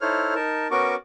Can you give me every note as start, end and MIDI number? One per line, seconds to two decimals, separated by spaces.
0.01 0.34 63
0.01 0.34 64
0.01 0.34 69
0.01 0.34 72
0.01 0.34 73
0.01 0.34 89
0.35 0.68 63
0.35 0.68 70
0.35 0.68 81
0.71 0.95 59
0.71 0.95 61
0.71 0.95 66
0.71 0.95 70
0.71 0.95 85
0.71 0.95 86